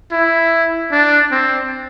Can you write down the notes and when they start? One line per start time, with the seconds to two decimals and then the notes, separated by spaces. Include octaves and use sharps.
0.12 E4
0.91 D4
1.31 C4